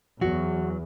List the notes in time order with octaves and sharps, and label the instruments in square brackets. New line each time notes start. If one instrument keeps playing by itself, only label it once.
[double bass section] E2 [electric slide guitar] F#3 [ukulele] F#4